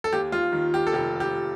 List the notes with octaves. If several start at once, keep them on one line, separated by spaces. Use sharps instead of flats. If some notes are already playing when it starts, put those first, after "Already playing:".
A4
D#2 G4
F4
D#3
G4
A4
F1 G4
G4